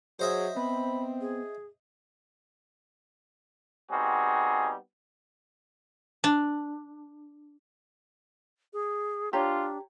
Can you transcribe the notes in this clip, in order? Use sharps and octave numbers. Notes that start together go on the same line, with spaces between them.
F#3 G#4 C5 D#5 E5
B3 C4 B5
G#4
G3 B3 C4 D#4 F#4 G#4
D4
G#4
D4 F4 G4 C#5 A#5